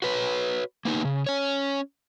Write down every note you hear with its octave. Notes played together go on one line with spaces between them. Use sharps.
F#4 B4 C#5
A#3 B3 D#4
C#3
C#4 C#5